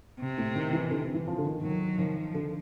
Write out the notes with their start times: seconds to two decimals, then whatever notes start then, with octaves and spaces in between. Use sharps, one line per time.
0.20 C3
0.38 A2
0.55 D#3
0.73 E3
0.91 D3
1.14 E3
1.27 F3
1.38 D3
1.44 D#3
1.62 D#3 F#3
1.98 D#3 F3
2.34 D3